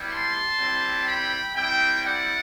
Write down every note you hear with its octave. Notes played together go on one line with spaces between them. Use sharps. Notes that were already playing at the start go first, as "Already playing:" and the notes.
Already playing: G3 B3 E4 G4
A5 C6
G3 C4 E4
G5 B5
G3 C4 E4 E5 G5
D5 F#5